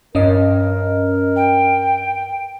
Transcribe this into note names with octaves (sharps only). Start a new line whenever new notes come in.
G2 C#4 A#4 D#5
G5